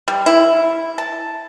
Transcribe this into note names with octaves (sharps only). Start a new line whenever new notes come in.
G3
E4
A5